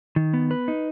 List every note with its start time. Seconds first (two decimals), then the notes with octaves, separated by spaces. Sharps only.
0.16 D#3
0.34 B3
0.51 B4
0.68 D#4